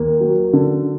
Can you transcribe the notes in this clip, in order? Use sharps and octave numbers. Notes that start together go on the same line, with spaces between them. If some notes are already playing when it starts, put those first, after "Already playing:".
Already playing: D#2 A#3
F#3
D3